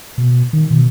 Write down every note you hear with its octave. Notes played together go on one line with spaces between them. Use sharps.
B2
D#3
B2